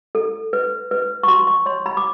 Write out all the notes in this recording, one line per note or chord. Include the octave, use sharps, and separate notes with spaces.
A4
B4
B4
C#6
F#4 C6
C#6
C#5 C6
B5
D6